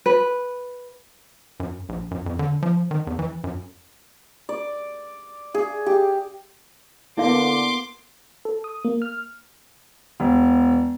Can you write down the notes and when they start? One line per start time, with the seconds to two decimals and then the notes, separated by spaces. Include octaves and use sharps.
0.06 B4
1.60 F#2
1.89 A#1
2.11 F#2
2.26 F2
2.39 D3
2.62 F3
2.91 D#3
3.07 E2
3.19 E3
3.44 F#2
4.49 D5
5.54 G#4
5.86 G4
7.17 D3 A#3 B3 E4 F5 C6 D6
8.45 A4
8.64 D#6
8.84 A#3
9.02 F6
10.20 E1